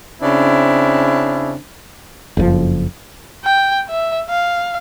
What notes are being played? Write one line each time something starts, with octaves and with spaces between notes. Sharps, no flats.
C#3 C4 D4 E4
F#1 F2 C#3 F3
G5
E5
F5